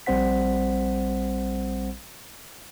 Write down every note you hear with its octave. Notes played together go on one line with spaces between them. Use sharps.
A#1 G3 C4 C5 F#5 B6